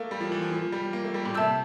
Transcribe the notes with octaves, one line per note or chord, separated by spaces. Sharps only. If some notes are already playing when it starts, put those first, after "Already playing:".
Already playing: A3 A#3 A#4 F5
G3
F3
E3
F3
F3
G3
A#3
A3
G3
A#2
C3 E5 A5 E6 G6